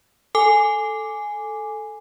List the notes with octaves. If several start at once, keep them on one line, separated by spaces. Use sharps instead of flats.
A4 G#5 D6